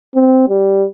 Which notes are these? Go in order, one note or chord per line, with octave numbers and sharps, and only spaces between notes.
C4
G3